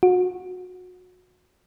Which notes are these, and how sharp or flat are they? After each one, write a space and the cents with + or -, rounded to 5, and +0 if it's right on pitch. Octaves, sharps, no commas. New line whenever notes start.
F#4 -25